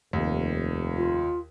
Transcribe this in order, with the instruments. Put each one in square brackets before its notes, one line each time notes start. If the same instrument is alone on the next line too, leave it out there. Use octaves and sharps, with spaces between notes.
[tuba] F1 [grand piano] D#2
[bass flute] F4